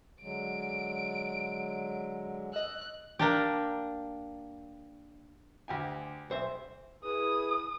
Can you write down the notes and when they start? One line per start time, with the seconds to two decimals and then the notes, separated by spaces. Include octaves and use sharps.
0.22 D3 F#3 G#3 D7
2.53 D#5 E6 F#6
3.19 A#3 D4 G4
5.68 D2 G4 G#5
6.30 B1 C5 E5
7.04 E4 G#4 B4 D#6